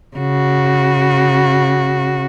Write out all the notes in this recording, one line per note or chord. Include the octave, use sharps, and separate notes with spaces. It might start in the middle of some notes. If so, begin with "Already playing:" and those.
C#3 F#4